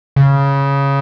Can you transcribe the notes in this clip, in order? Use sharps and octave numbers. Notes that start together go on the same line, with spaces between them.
C#3